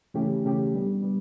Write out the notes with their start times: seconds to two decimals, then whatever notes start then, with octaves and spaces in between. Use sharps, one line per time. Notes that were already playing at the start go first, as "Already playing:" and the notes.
0.14 C#3 E3 A3 C#4 G4
0.44 C#3 E3 A3 C#4 G4
0.73 G3 B3 D4
1.02 G3 B3